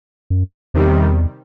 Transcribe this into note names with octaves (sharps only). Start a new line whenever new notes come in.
F#2
E2 C3 D#3 G3